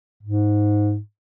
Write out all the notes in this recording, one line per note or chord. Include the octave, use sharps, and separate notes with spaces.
G#2